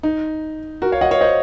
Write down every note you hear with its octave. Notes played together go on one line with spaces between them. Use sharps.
D#4
F#4 A#4
C#5 F5
D#5 F#5
C#5 F5
C5 D#5